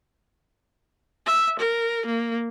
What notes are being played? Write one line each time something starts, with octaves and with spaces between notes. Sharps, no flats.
E5
A#4
A#3